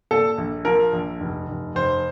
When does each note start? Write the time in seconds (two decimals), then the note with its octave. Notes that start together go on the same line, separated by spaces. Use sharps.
0.11 A#2 A4
0.38 A#1
0.65 F3 A#4
0.93 A#1
1.20 F1
1.48 F1
1.75 F1 C5